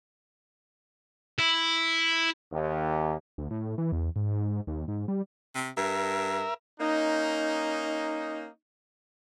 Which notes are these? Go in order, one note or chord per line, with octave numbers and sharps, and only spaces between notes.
E4
D#2
D2
A2
E3
E2
G#2
D#2
G#2
G3
C3
G2 A#4 E5
A#3 C#4 D#4